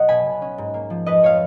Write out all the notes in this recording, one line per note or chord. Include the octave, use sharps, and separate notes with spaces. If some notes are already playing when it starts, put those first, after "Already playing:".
Already playing: B1 D#5 F#5
B2 G#5 B5
B2
C#4
G#2
A#3
F3
F2 B4 D#5
F2 C#5 F5